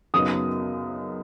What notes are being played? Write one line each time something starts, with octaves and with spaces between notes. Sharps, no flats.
F#2 C#3 F#3 B3 D#4 D#6